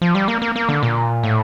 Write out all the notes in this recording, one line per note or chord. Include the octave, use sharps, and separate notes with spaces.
F3
G3
A#3
A#3
A#3
D3
A#2
A2